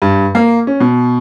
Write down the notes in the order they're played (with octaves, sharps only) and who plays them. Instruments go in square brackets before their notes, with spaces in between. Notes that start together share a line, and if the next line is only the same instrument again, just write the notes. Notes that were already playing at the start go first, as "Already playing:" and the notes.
[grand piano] G2
A#3
C#4
B2